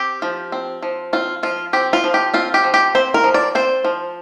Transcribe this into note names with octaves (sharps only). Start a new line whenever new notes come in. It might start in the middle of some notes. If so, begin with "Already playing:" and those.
Already playing: C4 G4
F3
C4
F3
C4 F4
F3 F4
C4 G4
F4
F3
G4
C4 F4
G4
F3
G4
C4 C5
A#4
F3
D5
C4 C5
F3